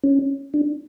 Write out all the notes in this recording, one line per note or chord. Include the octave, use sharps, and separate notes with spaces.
C#4
D4